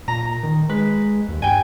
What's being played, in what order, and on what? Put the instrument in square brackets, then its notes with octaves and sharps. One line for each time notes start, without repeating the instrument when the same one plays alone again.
[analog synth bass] A#2 [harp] A#5
[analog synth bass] D#3
[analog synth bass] G#3 [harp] B4
[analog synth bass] D#2
[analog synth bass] G2 [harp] G5 G#5